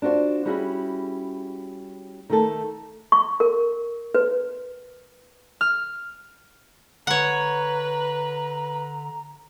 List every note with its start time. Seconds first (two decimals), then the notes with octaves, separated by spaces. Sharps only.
0.02 D4 F4 F#4 C5
0.45 G3 C#4 E4 F#4 G#4
2.30 D#3 A3 A4
3.12 C#6
3.40 A#4
4.15 B4
5.61 F6
7.07 D3 B4 C#5 F#5 A#5